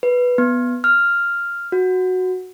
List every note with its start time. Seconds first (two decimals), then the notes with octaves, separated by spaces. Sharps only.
0.03 B4
0.38 B3
0.84 F6
1.72 F#4